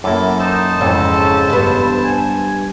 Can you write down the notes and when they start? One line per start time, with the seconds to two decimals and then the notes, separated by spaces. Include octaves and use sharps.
0.04 F#2 A#3 E4 A4 D6
0.39 D#4 C5 A5
0.81 F2 G#2 C#3 E3 A4
1.50 G2 B3
2.04 F#5 G#5